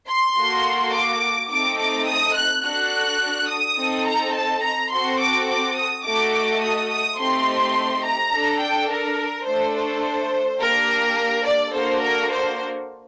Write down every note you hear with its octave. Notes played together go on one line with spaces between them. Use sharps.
C6
A#3 F#4 A4
D6
A3 C4 D#4 A4 D6
D6
D#6
F#6
D4 F#4 A4 F#6
D#6
C4 D#4 A4
A#5
A5
A#5
C4 F#4 A4 C6
D6
D6
D#6
A3 D#4 F#4 A4 D6
D6
D#6
D#6
A3 C4 D#4 G4 C6
A#5
D4 A4
G5
A#4
A3 D4 A4 C5
C5
A#3 D4 G4 A#4
D5
A#3 D4 F#4 A4 C5
A#4
C5